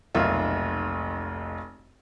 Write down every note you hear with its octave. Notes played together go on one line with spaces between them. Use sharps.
F1 B1 A#3 F4 E5